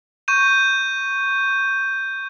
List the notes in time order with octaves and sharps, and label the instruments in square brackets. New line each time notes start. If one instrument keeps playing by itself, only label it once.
[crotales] C#6 G6 D#7